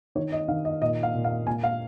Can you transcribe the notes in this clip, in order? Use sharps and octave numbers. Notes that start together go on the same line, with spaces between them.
D#3 C#5
D#5
D#3 F5
D#5
A#2 D#5
F5
A#2
F5
A#2 G#5
F5